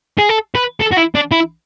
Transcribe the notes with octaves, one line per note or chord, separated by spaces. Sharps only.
G#4
A4
B4
A4
F#4
E4
D4
E4